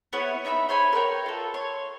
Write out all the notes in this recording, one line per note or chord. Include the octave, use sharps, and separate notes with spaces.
B3 E4 C#5
D#4 E5 A#5 B5
C5 C#5 G#5 B5
A#4 B4 C#5 G5
F4 A4
C#5 C6